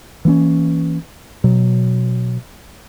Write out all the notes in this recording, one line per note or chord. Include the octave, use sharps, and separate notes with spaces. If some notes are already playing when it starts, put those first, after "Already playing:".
E3 A#3 B3 C#4
B2 F#3